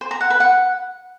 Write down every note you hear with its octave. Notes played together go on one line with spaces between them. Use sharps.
C5
A#5
F#5
B4
F#5